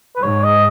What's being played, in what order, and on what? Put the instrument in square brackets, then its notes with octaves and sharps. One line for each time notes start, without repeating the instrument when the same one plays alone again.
[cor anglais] B4
[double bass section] G#2 [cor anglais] C#5
[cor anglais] D#5